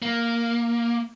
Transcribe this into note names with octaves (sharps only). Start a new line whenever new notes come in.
A#3